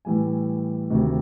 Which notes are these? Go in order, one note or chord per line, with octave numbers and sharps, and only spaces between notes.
A2 E3 G3 G#5
D2 C3 D#3